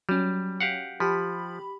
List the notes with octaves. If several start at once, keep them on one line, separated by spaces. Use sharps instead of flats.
F#3 G3 C#4
G4 F5 F#5
F3 G4 B5